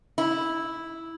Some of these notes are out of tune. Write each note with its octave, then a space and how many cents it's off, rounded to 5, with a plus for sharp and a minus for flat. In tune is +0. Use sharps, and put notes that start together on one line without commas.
E4 -5